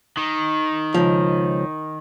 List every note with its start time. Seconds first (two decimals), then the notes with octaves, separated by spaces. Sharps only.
0.17 D#3
0.94 C#2 F3